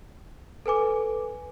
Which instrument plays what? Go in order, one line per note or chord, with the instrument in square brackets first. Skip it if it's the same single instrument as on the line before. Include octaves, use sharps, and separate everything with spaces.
[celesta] A4 B4 G#5 D6